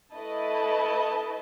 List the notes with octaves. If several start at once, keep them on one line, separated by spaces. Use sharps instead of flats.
A3 E4 B4 D#5 A5